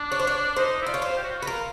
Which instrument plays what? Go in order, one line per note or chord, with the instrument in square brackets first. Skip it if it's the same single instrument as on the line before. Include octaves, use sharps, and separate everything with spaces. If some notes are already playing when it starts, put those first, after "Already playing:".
Already playing: [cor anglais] D4
[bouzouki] C#5
C5
C#5
[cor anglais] D#4 [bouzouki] C5
[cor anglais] E4
[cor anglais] F4 [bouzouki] D5
[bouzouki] C#5
C5
[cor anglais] G4
F#4
F4
F#4
[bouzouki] B4
[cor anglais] F4 [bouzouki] A#4